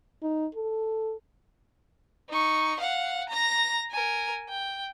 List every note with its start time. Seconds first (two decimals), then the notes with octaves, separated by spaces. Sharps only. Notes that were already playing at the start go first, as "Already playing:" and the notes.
0.23 D#4
0.55 A4
2.29 D#4 C#6
2.79 F5 F#5
3.29 A#5 A#6
3.91 A#4 G#5
4.49 G5